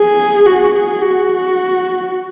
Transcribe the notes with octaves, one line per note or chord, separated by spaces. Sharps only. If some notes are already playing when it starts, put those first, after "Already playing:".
Already playing: G#4
F#4
G#4
F#4